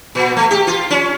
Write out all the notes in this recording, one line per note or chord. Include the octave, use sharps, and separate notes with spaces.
A#2
A3
G4
F4
C#4